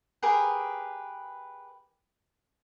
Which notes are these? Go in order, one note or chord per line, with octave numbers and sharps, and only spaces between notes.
G4 G#4 A#4 B4